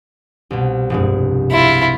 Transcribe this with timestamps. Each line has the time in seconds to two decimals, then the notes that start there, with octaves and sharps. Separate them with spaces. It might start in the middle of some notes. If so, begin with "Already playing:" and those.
0.51 C2 B2
0.90 F1 G2 G#3
1.51 E4 F4